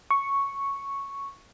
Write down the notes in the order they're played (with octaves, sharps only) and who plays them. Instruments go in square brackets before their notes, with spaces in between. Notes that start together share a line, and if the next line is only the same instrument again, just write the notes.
[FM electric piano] C#6